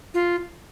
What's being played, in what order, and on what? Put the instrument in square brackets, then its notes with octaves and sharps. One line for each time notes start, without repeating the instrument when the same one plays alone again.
[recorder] F4